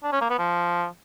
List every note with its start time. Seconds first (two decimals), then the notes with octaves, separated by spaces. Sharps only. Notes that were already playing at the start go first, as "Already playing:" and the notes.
0.03 D4
0.12 C#4
0.21 A#3
0.30 B3
0.39 F3